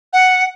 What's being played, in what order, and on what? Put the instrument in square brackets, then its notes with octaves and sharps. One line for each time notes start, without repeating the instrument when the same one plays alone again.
[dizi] F#5